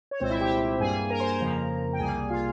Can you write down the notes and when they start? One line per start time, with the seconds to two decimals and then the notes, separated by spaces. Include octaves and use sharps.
0.11 C#5
0.20 C2 A#2 G#3 C4 C5
0.30 E4 E5
0.40 G4 G5
0.80 G2 G3 A#3 G#4 G#5
1.10 A#4 A#5
1.20 C5 C6
1.30 A#4 A#5
1.40 F2 C#3 F3 A#3
1.93 G5
1.99 C2 C3 G3 A#3 G#4 G#5
2.30 F4 F5